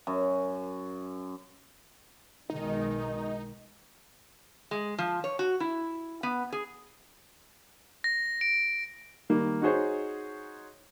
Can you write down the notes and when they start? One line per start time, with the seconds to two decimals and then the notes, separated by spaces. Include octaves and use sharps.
0.07 F#2
2.50 B1 D#3 G#3 D#4
4.71 G#3
4.98 F3
5.24 C#5
5.39 F#4
5.60 E4
6.23 B3
6.52 G#4
8.04 A#6
8.41 D7
9.30 D#3 G3 A#3
9.61 D#4 F#4 G#4 C5 C#5